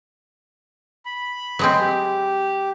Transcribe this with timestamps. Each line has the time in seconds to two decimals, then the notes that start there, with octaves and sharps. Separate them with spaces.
1.05 B5
1.59 F#3 G#3 C4
1.80 G4